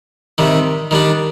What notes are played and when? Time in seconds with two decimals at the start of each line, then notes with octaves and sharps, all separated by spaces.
0.38 C3 D#3 G3
0.91 D#3 G3 D4